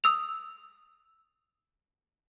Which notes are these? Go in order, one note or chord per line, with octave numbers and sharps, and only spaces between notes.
D#6 E6 F7